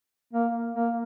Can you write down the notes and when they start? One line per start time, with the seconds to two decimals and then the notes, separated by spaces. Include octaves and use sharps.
0.33 A#3
0.75 A#3